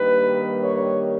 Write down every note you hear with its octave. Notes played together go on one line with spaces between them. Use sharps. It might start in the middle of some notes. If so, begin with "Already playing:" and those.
Already playing: G2 D#3 G3 A#3 B4
C#5